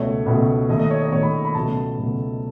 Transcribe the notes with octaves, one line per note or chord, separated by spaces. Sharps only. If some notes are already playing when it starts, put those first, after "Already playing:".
Already playing: C#2 B2 A3 C#5
C#2 B2 A3
D#2 D#3 A3 D#5
D#5
C#5
D#5
D#2 D#3 A3 C#5
B5
B5
C#2 B2 F#3 A3 A5
C#2 B2 F#3 A3